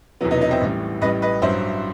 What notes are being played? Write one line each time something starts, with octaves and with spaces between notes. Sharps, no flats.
E1 E2 C3 F#3 B3
B3 D#4
B3 D#4
C4 E4
A1 A2 E3 G3
A1 A2 G3 B4 D#5
B4 D#5
A1 G2 F#3 C5 E5